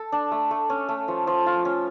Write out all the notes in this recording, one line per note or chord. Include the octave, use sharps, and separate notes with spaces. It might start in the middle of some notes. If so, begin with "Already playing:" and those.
Already playing: A4
D4
A3
A3
C#4
A3
F3
F3
F4
C#4